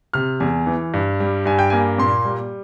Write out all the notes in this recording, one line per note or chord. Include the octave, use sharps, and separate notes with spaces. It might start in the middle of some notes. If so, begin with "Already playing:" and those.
C3 F6
E2 G#5
E3
G2
G3
G2 G#5
G5
A#3 G#5
A#2 C6
G3